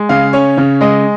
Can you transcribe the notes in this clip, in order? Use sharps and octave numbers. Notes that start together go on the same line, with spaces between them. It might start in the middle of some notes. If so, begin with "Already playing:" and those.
Already playing: G#3
C#3 F5
C#4 C#5
C#3
G#3 D#5